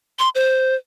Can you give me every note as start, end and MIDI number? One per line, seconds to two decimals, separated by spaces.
0.19 0.29 84
0.35 0.75 72